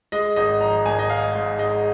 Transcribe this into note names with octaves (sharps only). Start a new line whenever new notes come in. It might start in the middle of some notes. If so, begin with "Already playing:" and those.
G#3 D#5
G#1 D#5
F3 A#5
G#1 G#5
D#5
G#2 F5
G#2
G#3 D#5